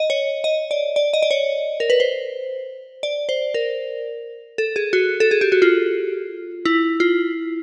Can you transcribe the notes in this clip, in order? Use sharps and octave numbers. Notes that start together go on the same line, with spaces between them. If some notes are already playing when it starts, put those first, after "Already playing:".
Already playing: D#5
C#5
D#5
D5
D5
D#5
D5
C#5
A#4
B4
C5
D5
C5
A#4
A4
G#4
F#4
A4
G#4
G4
F#4
F4
E4
F4